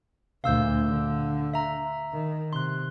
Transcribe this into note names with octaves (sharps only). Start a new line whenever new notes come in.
D2 A#2 F5 E6 G6
D3
E5 A#5
D#3
C3 C6 F#6